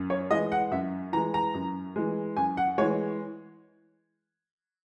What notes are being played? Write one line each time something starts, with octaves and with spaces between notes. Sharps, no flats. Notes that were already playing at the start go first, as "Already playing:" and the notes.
Already playing: F#2
C#5
E3 G#3 D#5
F#5
F#2 E5
E3 G#3 A#5
A#5
F#2
E3 G#3
F#2 G#5
F#5
E3 G#3 C#5